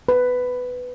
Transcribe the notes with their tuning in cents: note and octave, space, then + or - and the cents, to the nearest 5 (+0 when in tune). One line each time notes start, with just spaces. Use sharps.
B4 +10